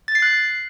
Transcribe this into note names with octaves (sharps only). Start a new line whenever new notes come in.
A6
C7
F#6